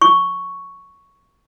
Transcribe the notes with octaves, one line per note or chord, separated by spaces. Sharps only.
C#6